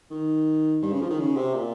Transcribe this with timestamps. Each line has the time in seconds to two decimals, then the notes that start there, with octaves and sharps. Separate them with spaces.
0.11 D#3
0.83 G2
0.92 C#3
1.01 F3
1.10 D#3
1.19 C#3
1.37 C3
1.54 A#2